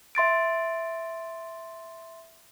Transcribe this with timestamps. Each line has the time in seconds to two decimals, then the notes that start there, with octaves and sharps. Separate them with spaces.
0.15 E5 C6 A6 D7